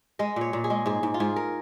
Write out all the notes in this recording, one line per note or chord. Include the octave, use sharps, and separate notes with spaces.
G#3 D#5
A#2 C#5
A#2
G#4
G#3
G#2 G#4
G#2
F4
G#2 G#4
A#4